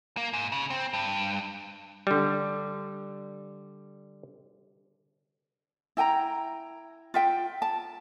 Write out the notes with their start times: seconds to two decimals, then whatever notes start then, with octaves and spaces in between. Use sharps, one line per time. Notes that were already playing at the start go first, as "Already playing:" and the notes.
0.17 A#3
0.33 G#2
0.52 C#3
0.70 C4
0.93 G2
2.07 D3 G3
5.97 E4 G5 G#5 A#5
7.14 F4 E5 G5
7.62 A5